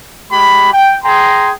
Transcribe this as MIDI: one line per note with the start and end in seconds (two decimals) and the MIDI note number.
0.31 0.72 56
0.31 0.72 67
0.31 0.72 83
0.72 0.97 79
1.04 1.50 68
1.04 1.50 79
1.04 1.50 82
1.04 1.50 84